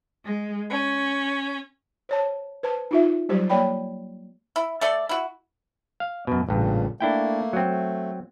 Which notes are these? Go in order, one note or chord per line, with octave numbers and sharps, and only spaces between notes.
G#3
C#4
C5 C#5 A5
B4 C5 A5
D#4 F4 E5
F#3 G3 G4 C5
A#3 C#5 D5 G5 B5
E4
A3 A4 D5
E4 F#4
F5
F#2 B2
A1 G2 A#2 C#3
A3 A#3 D4 E4 G5
F#3 C4
A3